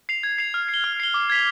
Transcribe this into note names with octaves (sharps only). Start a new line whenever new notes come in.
C7 F7
G#6
C7 F7
F6
C7
G7
F6
C7 G7
D6
G#6 B6 F7